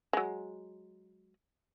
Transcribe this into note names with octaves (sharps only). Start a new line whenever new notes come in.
F#3 G#3